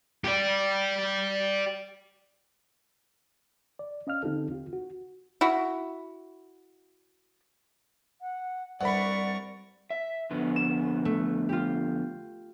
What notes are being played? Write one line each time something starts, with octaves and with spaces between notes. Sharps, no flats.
G4 D5
D5
C#4 D#5 F5 F6
D3 C4 D#4 F4 G4 A4
F4 G4
F#4
E4 F#4
F#5
C2 G2 C3 A#4 D5 F#5 B5 C#6
E5
F2 D3 B3
E7
A3
F4 G4